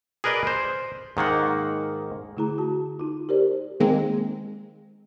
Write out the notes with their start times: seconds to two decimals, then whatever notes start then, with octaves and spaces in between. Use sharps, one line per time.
0.24 G#4 A#4 B4 D5 D#5
0.47 C5
1.17 G#2 D#3 A#3 F#5
2.37 D3 A3 E4 G#4 A#5
2.58 F#4 A5
2.99 D#4 F4
3.29 G4 G#4 A#4 C5 D5
3.80 D#3 G#3 A#3 C4